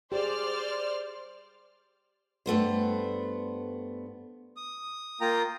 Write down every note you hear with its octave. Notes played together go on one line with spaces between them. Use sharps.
G4 G#4 C5 D5 F6
G2 A3 B3 C5
D#6
A#3 F4 G5 A#5 D#6